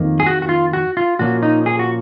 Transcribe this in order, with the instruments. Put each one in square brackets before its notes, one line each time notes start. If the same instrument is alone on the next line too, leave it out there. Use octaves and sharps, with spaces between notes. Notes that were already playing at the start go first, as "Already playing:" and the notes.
Already playing: [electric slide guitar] F2 D#3 A#3
G#4
F#4
F#4
F4
F#4
F4
A#2 F3 A#3 C#4 F#4
D#4
G#4
F#4